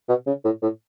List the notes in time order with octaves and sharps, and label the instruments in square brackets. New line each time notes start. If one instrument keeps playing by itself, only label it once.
[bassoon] B2
C#3
A2
A2